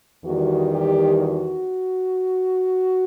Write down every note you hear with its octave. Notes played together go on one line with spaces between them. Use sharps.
E2 D#3 G3 F#4
G4
F#4